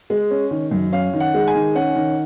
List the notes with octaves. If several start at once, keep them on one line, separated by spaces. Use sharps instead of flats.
G#3
C#4
D#3
F#2
C#4 F5
D#3
F#5
G#3
G#5
D#3
C#4 F#5
D#3